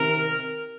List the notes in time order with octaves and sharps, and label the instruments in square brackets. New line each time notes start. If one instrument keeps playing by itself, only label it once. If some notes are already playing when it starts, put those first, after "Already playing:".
Already playing: [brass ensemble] C3 D#3 A#4